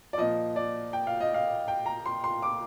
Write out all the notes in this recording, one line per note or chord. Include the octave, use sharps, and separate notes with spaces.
D5
A#2 F3 D#5
D5
G5
F5
D#5
F5
G5
A#5
C6
C6
D6